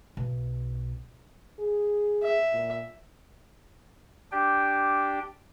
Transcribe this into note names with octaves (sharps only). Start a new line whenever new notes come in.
B1
G#4
E5
A#2
D4 G4 G5